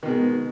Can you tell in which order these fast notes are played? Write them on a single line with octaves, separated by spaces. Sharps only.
D#3 B2 G#3